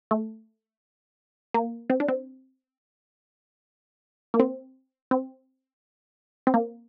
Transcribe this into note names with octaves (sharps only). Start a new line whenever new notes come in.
A3
A#3
C4
D4
C4
A#3
C4
C4
C4
A#3